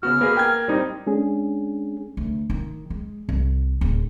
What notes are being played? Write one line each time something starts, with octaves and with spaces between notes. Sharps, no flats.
C#3 B3 F#4 F6
A#3 B3 G#4 A#4 B4
G5 G#6
G3 C4 D#4
G#3 C#4 D4 G#4
D2
D#3
G#3
C2
D1